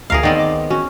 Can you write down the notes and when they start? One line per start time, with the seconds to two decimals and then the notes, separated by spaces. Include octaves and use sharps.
0.10 D2 G#4 A#4 F5 A#5 C7
0.23 D#3 B3 C4 D5 G5
0.38 D#5 D6
0.70 C#4 F#4